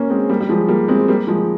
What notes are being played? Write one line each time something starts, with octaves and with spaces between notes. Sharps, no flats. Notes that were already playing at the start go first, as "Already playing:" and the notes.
Already playing: A#3 C#4
G#3 C4
G3 A#3
G3
F3 G#3
G3 A#3
G#3 C4
G3 A#3
F3 G#3